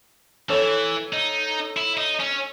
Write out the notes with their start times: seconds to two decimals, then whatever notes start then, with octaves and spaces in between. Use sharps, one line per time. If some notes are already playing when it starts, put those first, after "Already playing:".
0.49 E3 A4 C#5
1.13 D#4
1.77 E4
1.98 D#4
2.20 C#4